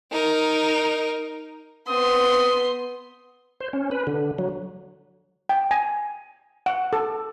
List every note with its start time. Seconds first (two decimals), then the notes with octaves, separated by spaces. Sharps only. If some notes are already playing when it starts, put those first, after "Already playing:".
0.11 D#4 A#4
1.89 B3 C4 C6 D#6
3.61 C5
3.73 C#4
3.91 B4
4.07 D3
4.38 F#3
5.49 G5
5.71 G#5
6.66 F#5
6.93 A4